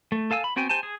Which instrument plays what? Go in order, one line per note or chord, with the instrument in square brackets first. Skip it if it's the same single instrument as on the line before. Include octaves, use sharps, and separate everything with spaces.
[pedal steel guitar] A3
A4 F5 G#5 E6
B5
B3 C4 F#4 G5 G#5
G4 C5 G#5 A5
G#4